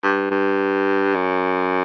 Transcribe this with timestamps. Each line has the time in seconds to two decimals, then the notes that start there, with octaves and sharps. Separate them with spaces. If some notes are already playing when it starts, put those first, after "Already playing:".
0.03 G2
0.31 G2
1.15 F#2